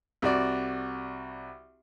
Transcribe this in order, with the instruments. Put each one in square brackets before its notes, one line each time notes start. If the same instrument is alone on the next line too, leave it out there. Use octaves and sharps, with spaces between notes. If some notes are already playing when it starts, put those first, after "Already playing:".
[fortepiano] C2 F#4 D5